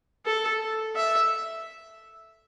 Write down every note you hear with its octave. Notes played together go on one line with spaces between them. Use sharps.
A4
E5